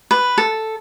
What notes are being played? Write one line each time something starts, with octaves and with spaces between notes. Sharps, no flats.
B4
A4